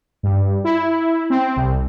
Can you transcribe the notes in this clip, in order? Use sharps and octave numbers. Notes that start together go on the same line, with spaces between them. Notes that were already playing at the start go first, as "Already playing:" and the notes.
G2
E4
C4
C2